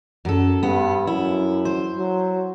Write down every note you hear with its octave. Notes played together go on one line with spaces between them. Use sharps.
F#2 A4
G2 B3
F#2 E4
C5
F#3